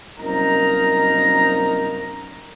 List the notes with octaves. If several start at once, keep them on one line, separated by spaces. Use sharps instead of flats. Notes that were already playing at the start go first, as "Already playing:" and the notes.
C2 F#2 A#3 D#4 A#4 A#5